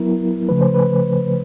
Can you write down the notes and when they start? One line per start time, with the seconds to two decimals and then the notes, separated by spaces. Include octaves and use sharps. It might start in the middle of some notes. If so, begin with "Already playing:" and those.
Already playing: F#3 B3 E4 A#4
0.49 C#3 F3 A3 B4
0.61 C5
0.74 B4